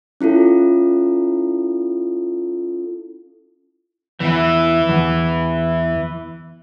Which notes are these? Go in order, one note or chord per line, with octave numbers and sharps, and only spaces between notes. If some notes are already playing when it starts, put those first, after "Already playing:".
C#4 E4 F4 A4
E2 E3 E4
E2